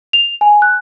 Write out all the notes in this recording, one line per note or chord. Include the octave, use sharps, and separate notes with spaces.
F7
G#5
F#6